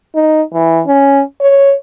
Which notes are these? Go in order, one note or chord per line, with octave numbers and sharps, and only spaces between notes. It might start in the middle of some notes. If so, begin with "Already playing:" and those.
D#4
E3
C#4
C#5